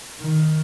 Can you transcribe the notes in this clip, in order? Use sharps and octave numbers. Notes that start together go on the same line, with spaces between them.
D#3